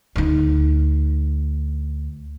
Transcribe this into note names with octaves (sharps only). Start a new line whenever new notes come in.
D2 D#4